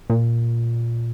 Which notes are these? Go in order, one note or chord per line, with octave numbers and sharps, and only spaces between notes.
A#2